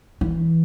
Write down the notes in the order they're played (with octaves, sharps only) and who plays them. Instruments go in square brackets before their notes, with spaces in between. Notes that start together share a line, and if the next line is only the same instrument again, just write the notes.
[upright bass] E3